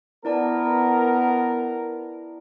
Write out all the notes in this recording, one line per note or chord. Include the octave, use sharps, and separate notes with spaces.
B3 E4 A#4 D5 A5